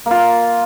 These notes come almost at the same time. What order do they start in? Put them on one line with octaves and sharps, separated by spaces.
A#3 F4 A#4